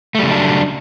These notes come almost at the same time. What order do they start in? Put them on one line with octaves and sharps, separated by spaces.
A3 G3 C#3 F#3 D4